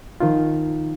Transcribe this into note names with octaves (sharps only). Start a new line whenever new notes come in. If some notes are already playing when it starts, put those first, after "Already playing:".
D#3 F3 D#4 F4